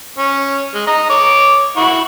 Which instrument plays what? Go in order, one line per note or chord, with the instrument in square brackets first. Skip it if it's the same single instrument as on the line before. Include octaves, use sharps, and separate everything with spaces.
[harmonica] C#4
G#3
D#5 A#5
C#5 D6
E4 F#5 C#6